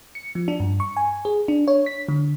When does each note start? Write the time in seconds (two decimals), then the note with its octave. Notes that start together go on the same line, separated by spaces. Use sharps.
0.15 C#7
0.35 F3
0.48 D4
0.60 G2
0.80 C#6
0.97 G#5
1.25 G#4
1.48 D4
1.68 C#5
1.86 B6
2.09 D3